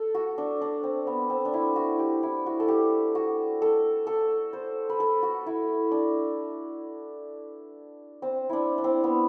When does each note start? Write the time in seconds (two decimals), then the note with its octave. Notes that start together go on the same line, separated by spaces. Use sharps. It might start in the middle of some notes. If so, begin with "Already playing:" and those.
Already playing: A4
0.15 F#4
0.38 D4
0.61 D4
0.83 C4
1.07 B3
1.30 C4
1.45 D4
1.53 E4
1.76 F#4
1.99 G4
2.23 E4
2.46 F#4
2.60 A4
2.68 G4
3.15 F#4
3.62 A4
4.07 A4
4.53 C5
4.89 B4
5.00 A4
5.23 F#4
5.46 E4
5.91 D4
8.22 C4
8.49 D4 E4
8.78 D4
8.84 C4
9.04 B3